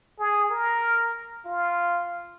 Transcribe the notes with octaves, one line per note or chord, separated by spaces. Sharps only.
G#4
A#4
F4